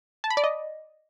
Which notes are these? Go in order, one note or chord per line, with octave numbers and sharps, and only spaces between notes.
A5
B5
D5
D#5